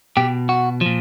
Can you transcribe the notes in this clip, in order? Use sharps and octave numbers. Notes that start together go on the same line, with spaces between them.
B2 G4
F#4
A#2 F3